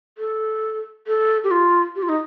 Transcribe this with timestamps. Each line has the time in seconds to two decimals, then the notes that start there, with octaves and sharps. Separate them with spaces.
0.18 A4
1.07 A4
1.44 G4
1.51 F4
1.96 G4
2.03 F4
2.09 D#4